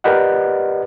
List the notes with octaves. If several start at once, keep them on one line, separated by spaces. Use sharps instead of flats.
G4 A#4 B4 D5 D#5 F#5